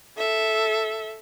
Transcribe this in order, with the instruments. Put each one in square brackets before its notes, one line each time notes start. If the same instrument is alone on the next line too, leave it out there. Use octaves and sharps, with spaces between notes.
[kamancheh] A4 E5